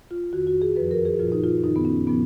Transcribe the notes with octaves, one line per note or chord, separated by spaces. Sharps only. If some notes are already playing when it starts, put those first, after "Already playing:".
F4
F2 D#3 F#4
F#4
G#4
F#2 F3 B4
A#4
G#4
A#2 F3 F4
D#4
F4
F#2 D#3 D#4
B3
C#4
A#2 F3 B3